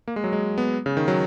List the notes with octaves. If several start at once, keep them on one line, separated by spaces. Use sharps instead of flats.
A#3
G#3
F#3
G#3
B3
C#3
D#3
F#3